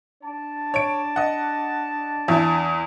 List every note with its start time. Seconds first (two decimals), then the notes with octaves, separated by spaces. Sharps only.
0.23 D4 D5 A5
0.74 C#5 D7
1.16 D#5 F#5
2.28 E2 E4